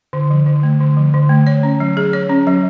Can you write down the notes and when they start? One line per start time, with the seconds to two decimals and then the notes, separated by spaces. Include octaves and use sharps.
0.13 D3
0.30 F3
0.46 D3
0.63 A3
0.80 D3
0.97 F3
1.14 D3
1.29 A3
1.47 C#5
1.63 C#4
1.80 F#3
1.97 G#4
2.13 C#5
2.30 C#4
2.47 F#3